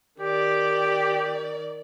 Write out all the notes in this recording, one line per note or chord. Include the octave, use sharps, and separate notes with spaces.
D#3 G4 D5